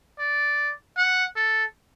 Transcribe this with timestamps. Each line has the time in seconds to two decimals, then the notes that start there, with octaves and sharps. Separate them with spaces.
0.19 D5
0.97 F#5
1.36 A4